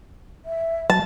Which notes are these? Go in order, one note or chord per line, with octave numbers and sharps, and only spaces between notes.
E5
F#3 A5